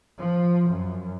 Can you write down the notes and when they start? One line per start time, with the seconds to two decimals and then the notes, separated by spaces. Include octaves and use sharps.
0.18 F3
0.70 F#2